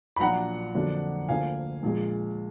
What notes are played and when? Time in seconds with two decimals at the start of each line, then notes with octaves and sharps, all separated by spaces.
0.16 B5
0.20 A#1 A#2 F#3 D4 F#5 A#5
0.75 F2 D3 F#3 A#3 D4
1.28 D2 D3 F3 A#3 F5 G#5
1.83 A#1 A#2 G#3